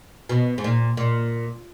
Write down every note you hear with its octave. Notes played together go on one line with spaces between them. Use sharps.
B2
G#2
A#2
A#2